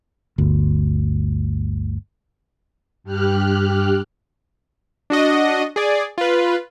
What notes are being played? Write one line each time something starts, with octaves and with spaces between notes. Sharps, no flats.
G1 D2
G2 G4 F6 F#6
D4 F#4 D#5
G#4 D5
F4 B4